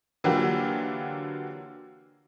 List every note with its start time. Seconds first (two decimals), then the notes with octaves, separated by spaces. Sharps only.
0.24 D3 E3 F#3 A#3 F4 G4